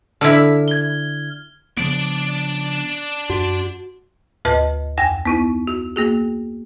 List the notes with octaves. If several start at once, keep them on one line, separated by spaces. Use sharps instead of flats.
D3 E4 F6
G#6 G7
C#3 F3 B3 D4 D5 D7
F#2 F#4
D2 G#2 B4 D#5 A5
F2 G5 G#5 A#6
B3 D#4 E4
F#4
A#3 F#4 G#4